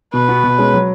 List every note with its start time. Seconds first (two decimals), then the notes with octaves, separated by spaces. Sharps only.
0.13 B2 B4
0.28 B3 F#4
0.44 B2
0.59 G#3 C#4
0.74 F#3